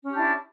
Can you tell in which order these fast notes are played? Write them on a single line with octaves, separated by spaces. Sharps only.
C#4 G4 D4 E4